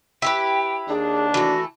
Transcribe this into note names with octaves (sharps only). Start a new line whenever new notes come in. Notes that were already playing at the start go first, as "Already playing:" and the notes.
E4 G4 B4 G5
D#2 D4 G#4
E3 A3 F#4